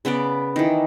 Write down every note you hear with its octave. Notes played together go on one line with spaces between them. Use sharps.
C#3 B3 B4 D5
D#3 E3